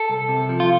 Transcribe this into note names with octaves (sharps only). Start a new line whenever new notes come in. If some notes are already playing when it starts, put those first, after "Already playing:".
Already playing: A4
C2
C3
F3
F4